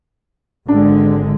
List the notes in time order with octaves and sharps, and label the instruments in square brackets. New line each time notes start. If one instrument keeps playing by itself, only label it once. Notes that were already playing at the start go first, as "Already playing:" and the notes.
[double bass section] G#1 D3 G#3 [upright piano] D4